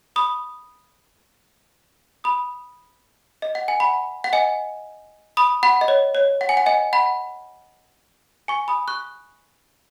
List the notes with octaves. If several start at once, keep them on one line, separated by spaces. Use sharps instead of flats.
B5 D#6
B5 D#6
D#5
F#5
G#5
F#5 B5
F#5
D#5 G#5
B5 D#6
F#5 B5
D#5
C#5
C#5
F#5
G#5
F#5
D#5 G#5
F#5 B5
G#5 C#6
B5 D#6
C#6 F#6